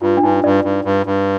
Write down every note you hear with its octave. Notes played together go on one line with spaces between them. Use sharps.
G2 F4
D4
G2 D#4
G2 D5
G2
G2
G2